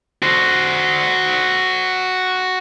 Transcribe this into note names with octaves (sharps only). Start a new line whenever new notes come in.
F#4 C5